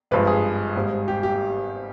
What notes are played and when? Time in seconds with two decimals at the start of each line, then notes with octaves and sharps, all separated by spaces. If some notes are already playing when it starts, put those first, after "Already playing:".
0.11 G#1 G2 F3 G#3 B4
0.27 G#4
0.76 G#1 G#2 G3
1.08 G4
1.23 G4